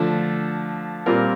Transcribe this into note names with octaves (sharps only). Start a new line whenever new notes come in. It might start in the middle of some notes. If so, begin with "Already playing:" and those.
Already playing: D3 F3 A3
A#2 G3 C4 F4 A#4